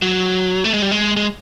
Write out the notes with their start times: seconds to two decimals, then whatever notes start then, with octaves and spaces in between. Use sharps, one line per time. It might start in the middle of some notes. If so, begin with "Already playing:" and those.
0.02 F#3
0.64 A3
0.74 G#3
0.82 G3
0.91 G#3
1.17 G#3